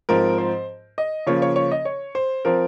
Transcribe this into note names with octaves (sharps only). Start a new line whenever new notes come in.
G#2 F3 C4 A#4
C5
D#5
C#3 F3 A#3 C#5
C#5
C#5
D#5
C#5
C5
F3 C4 A#4